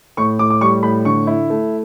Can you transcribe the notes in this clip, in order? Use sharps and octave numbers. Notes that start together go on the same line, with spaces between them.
A2 C#6
A2 D6
D6
G3 C#6
A2 B5
D3 C#6
E4
A3